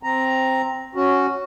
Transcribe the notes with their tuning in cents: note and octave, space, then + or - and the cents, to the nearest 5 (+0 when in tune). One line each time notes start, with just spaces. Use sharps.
C4 +0 A#5 +0
C#4 +0 F#4 +0